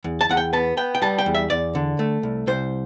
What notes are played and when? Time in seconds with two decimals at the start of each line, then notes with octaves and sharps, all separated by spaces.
0.04 E2
0.21 A5
0.29 E2 F#5
0.37 G5
0.53 B3 A5
0.77 B3 G5
0.95 G5
1.02 G3 A5
1.18 G5
1.26 E2
1.34 E5
1.50 E2 D5
1.75 D3
1.99 A3
2.23 C2
2.47 C2 C5